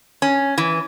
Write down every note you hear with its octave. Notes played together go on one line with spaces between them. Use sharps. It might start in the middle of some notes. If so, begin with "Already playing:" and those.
C#4
E3